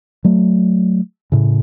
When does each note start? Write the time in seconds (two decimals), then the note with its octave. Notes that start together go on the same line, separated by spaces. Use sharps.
0.24 F#3 A3
1.32 A2 C#3